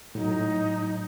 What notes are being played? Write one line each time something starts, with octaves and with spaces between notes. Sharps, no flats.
A2 F#3 D#4